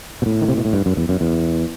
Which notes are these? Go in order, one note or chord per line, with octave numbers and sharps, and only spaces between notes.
B2
A2
D#3
C3
B2
A2
G2
F#2
E2
F#2
E2